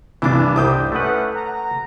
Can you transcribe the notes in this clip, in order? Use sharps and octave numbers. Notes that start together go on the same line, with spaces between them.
C2 G2 E3 D4 D6
C2 C5 D#5 G5 D6 D#6 G6
A3 C#4 E4 B4 F#5
F#5 A#5